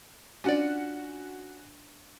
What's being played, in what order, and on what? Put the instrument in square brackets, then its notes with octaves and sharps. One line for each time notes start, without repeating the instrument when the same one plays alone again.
[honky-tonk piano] C#4 F#4 F#5 [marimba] D4 [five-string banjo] F4 D5